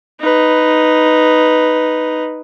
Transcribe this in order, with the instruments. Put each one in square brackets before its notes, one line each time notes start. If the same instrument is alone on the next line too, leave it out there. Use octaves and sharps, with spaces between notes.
[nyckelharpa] D#4 B4